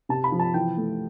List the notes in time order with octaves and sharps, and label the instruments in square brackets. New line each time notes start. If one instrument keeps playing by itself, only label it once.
[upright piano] C3 A5
B5
F3
A5
E3 G5
A3